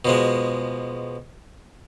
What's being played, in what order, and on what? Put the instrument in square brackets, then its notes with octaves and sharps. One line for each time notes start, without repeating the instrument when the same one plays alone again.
[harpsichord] B2 F3 G#3